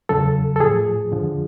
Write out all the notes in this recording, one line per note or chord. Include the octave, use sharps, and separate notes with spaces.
E2 C#3 F#3 A4
A4
A2 F3 G#4
F2 D3 F3